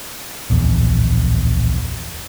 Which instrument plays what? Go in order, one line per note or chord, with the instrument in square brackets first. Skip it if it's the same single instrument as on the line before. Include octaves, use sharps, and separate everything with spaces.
[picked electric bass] D1 A#1 E2